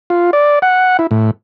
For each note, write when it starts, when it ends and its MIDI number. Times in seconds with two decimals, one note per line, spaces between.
0.10 0.31 65
0.33 0.59 74
0.62 0.97 78
0.99 1.07 64
1.11 1.31 45